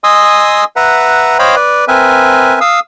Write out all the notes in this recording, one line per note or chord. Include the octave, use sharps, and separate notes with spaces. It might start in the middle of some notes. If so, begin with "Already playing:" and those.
D#5 G#5 C6 D#6 E6
B4 E5 F#5 A#5
C5 C#5 D#5 F5 G5 B5
B4 D5
C4 A#4 B4 E5 G#5
F5 D#6 E6